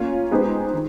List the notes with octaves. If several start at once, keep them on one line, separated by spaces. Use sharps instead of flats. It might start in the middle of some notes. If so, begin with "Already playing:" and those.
Already playing: A#3 C#4 F4
G#3 B3 D#4 G4 C5
D#3